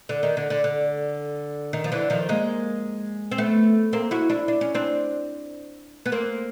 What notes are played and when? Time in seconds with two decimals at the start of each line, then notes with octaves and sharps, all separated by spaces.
0.09 D3
0.23 D#3
0.37 D3
0.50 D3
0.64 D3
1.73 D#3
1.84 F3
1.92 D3 E3
2.10 D#3 F3
2.29 G#3 A#3
3.31 C4
3.38 A3 B3
3.93 A#3 C4
4.11 E4 F#4
4.29 D4 E4
4.48 D4
4.61 C#4
4.75 C4 D4
6.06 B3
6.12 A#3 C4